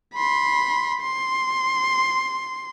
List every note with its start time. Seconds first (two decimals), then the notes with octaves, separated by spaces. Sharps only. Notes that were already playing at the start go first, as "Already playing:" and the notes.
0.15 B5 C6
1.01 C6